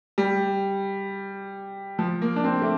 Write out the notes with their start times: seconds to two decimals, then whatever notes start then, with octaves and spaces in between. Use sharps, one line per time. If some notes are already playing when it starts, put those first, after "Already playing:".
0.18 G3
1.99 F3
2.22 A#3
2.36 D4
2.44 C4
2.61 A3